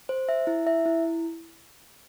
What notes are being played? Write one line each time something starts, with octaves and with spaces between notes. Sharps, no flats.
C5
E5
E4
E5
E4